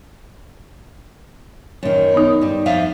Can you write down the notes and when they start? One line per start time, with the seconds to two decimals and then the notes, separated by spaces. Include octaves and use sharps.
1.83 F#2 D#3
2.14 B3 D#4
2.41 G2 G3
2.66 F2 E5 F5